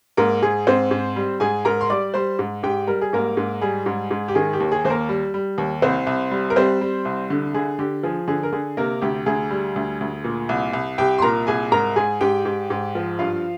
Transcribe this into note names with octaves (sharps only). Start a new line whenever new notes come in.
G#2 A#3 A#4
G#2 G#4
G#2 C4 C5
G#2
G3
G#2 G#4 G#5
G#2 A#4 A#5
C6
G3 D5 D6
G3 C5 C6
G#2
G#2 G4 G5
G3 A#4
G#4
G#2 A#3 A#4
G#2
G3 G#4
G#2
G#2
G4
D#3 G#4
G4
D#2
G#4
D#2 C5
A#3 A#4
G3
G3
D#2
C2 C4 C5
C2
G3
A#4
G3 C4 C5
G3
C2
D3
D3 G#4
D3 G4
F3 G#4
D3 G#4
A#4
D3 G#4
C3 A#3 A#4
D2 G4
D2 G#4
G3
D2
D2
A#2
C2
C2
C2 G4 G5
C6
A#2 A#4 A#5
C2 G#4 G#5
G#2 A#4 A#5
G#2 G#4 G#5
G#2 G4 G5
G#2
G#2
F3
G2 F4 F5